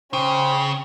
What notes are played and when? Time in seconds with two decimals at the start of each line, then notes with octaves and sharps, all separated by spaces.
0.13 C#3 C#4 C5 G5